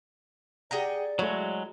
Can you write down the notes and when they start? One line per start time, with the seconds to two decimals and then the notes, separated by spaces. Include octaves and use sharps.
0.71 G4 G#4 D5 F#5 G5 A#5
1.19 F#3 G#3 A3 E4 C#5